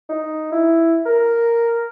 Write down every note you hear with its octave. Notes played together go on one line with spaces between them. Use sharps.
D#4
E4
A#4